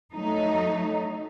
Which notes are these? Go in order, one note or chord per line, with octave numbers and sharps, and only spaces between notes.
F#3 A3 D#4